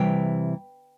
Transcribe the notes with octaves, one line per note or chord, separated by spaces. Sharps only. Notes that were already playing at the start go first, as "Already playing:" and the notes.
Already playing: C3 E3 G3 G5